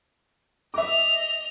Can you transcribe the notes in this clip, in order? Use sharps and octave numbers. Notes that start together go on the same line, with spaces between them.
D#5 E5 D6 F7